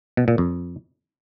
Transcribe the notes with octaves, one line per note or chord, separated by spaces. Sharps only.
B2
A#2
F2